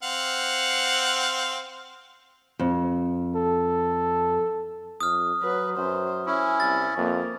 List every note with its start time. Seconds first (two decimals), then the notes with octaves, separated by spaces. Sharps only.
0.03 C4 F5 F#5
2.59 F2
3.35 A4
5.01 F2 D#6 F6
5.43 F#3 B4
5.77 F#2 C5
6.26 C#4 E4 G#5
6.60 C2 A6
6.97 F2 A#3